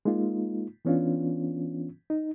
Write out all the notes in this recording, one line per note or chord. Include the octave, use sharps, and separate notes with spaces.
G#3 A#3 D#4 F4
E3 B3 C#4 D4 F4
D#4